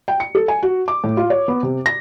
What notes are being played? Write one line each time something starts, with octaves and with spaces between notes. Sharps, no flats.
G5
C#7
A4
G#5
F#4
D6
A2
F4
C#5
B3
C3
A#6